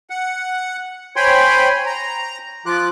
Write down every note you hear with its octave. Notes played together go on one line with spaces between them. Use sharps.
F#5
C5 C#5 G5 G#5 B5 C6
A#5
F3 F4 D6 F#6